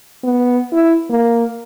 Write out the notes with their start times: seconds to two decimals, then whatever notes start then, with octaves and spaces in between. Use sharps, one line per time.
0.23 B3
0.72 E4
1.10 A#3